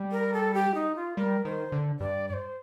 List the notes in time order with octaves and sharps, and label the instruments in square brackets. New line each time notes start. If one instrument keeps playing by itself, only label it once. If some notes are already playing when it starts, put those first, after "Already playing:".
Already playing: [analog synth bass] G3
[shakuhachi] A#4
A4
G4
D#4
F4
[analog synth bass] G3 [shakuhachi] A#4
[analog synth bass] D#3 [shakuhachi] C5
[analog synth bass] D3
[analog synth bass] G2 [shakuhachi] D5
[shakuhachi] D5
C5